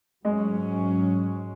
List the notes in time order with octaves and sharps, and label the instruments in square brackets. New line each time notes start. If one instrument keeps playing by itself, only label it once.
[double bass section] G#2 F#3 C#4 [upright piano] G#3